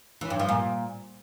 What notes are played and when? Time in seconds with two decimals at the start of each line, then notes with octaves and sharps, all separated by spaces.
0.21 E3
0.30 G2
0.39 F3
0.49 A#2